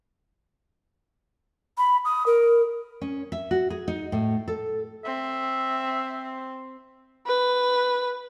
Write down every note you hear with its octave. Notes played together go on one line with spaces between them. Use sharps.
B5
D#6
A#4
C#4
E5
F#4
G#4
D#4
A2
A4
C4 E5
B4